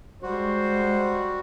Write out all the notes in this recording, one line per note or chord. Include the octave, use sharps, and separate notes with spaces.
G3 G#3 F#4 C5